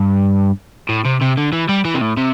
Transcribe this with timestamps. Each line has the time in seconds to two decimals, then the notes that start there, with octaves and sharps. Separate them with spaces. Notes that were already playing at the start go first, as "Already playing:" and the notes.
Already playing: G2
0.89 A2
1.05 C3
1.21 C3
1.37 D3
1.52 E3
1.69 G3
1.85 E3
1.94 C3
2.01 A2
2.17 C3